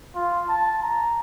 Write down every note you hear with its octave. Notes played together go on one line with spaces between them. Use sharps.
F4
A5
A#5